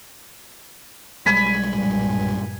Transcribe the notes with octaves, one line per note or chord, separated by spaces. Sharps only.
B1 G3 G#3 G#5 B5
A#1 G2